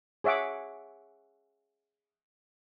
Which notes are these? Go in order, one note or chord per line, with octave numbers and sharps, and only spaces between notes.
G#4 C#5 E5 F#5 D6